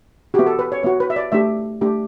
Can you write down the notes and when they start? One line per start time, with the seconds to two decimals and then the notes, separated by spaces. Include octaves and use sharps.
0.34 F#4 G4
0.39 B3
0.47 A4
0.59 B4
0.72 C#5
0.83 B3 F#4 C#5
1.00 B4
1.10 E5
1.16 D5
1.32 A3 D4 G4 E5
1.81 A3 D4 G4